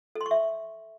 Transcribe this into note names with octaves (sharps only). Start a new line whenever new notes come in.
A4
C6
C#6
E5